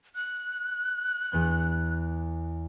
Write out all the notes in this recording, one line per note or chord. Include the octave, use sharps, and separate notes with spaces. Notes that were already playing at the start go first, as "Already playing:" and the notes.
F#6
E2 B3 G6